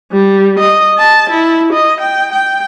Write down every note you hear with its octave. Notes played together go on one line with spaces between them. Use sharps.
G3
D#5
A5
E4
D#5
G5
G5